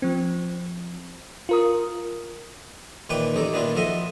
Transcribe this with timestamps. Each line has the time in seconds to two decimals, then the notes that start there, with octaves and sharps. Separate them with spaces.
0.02 F3 C4
1.49 F4 A#4 D#6
3.09 A#2 D#3 E3 B4 G5 D6
3.35 A1 D#4 A4 D5
3.52 A#2 D#3 B3 D4 E4 F4
3.75 F3 F#4 A4 D#5 E5 C6